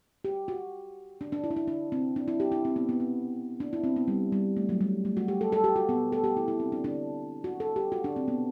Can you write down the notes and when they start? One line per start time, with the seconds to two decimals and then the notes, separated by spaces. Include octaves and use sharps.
0.25 G4
0.48 F#4
1.21 D4
1.32 D4
1.44 E4
1.51 D4
1.56 E4
1.68 D4
1.92 C4
2.16 D4
2.28 E4
2.40 G4
2.52 E4
2.65 C4
2.76 B3
2.89 B3
3.00 C4
3.60 D4
3.73 E4
3.84 C4
3.96 B3
4.08 G3
4.32 G3
4.57 A3
4.69 F#3
4.81 G3
5.05 A3
5.17 F#4
5.28 G4
5.41 A4
5.52 A4
5.64 G4
5.76 F#4
5.89 B3
6.12 A4
6.24 G4
6.37 E4
6.48 E4
6.60 C4
6.72 D4
6.84 D4
7.44 F#4
7.60 A4
7.76 G4
7.92 F#4
8.04 D4
8.16 C4
8.28 B3